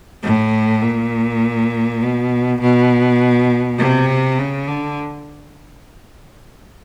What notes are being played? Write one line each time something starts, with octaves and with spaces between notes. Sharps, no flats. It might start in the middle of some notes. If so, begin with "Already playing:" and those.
A2
A#2
B2
B2
C3
C#3
D3